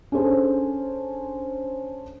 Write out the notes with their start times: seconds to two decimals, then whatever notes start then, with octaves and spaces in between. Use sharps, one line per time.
0.12 C#4 D4 G#4 A4 C5